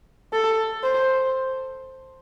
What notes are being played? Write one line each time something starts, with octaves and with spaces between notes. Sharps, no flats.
A4
C5